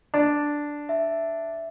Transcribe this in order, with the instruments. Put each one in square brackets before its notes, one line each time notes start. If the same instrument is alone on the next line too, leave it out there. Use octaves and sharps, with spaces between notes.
[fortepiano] D4
[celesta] E5